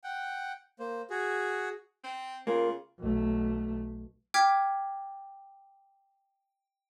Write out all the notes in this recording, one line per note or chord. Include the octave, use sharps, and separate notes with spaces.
F#5 G5
A#3 C5
F#4 G#4
C4
C#3 A#3 F4
B1 A3
G5 D6 F6 G#6 B6